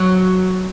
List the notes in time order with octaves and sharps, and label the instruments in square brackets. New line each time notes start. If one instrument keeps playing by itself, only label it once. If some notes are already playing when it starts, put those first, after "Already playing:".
Already playing: [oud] F#3